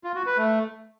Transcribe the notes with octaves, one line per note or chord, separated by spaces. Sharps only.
F4
F#4
B4
A3